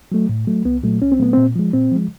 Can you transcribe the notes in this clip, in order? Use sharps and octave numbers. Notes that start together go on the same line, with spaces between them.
F#3 A3
A2
F#3 A3
C2 B3
A#2 F#3 A3
C2 C#4
C4
A#2 F#3 A3 B3
A#2 C4
F3 G#3
A#2 C4
F3 G#3